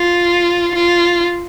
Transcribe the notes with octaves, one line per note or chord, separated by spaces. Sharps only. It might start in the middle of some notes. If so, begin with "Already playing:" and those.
Already playing: F4
F4